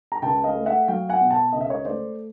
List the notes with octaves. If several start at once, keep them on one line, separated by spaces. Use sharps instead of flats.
A#5
C#2 G5 A5
D#5 F5
A3
E5 F#5
F#3 F5 G5
F#5 G#5
B2
G5 A5
C#2 D#5
E5
C#5 D#5
A3 C5 D5